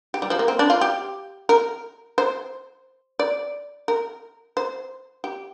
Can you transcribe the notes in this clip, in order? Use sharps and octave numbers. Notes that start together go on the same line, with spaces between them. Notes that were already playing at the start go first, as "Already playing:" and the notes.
G4
G3
F3
A#3
C4
D4
F4
G4
A#4
C5
D5
A#4
C5
G4